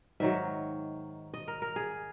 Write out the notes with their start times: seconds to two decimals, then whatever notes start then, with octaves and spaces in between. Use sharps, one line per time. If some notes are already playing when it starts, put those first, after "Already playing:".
0.20 G#2 D#3 F#3 E5
1.34 D#5
1.48 A#4
1.62 A#4
1.76 G#4